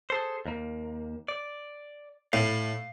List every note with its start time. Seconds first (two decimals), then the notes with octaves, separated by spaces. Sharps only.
0.10 G#4 A4 C5
0.46 D#2 A#3
1.28 D5
2.33 A2 F5